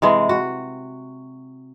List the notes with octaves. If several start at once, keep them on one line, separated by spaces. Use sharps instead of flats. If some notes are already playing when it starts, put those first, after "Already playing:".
C3 E3 G#3
F#4